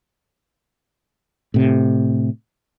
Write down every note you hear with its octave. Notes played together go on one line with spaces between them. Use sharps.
A2 C3